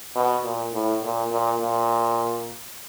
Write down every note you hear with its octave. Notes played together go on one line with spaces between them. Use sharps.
B2
A#2
A2
A#2
A#2
A#2